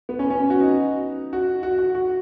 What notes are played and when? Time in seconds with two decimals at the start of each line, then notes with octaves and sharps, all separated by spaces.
0.09 B3
0.19 C#4
0.30 C#4
0.50 F#4
0.61 D#4
1.33 F#4
1.63 F#4
1.78 F#4
1.95 F#4